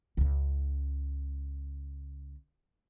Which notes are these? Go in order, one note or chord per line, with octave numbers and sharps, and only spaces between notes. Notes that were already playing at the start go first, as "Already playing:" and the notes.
C#2 C#3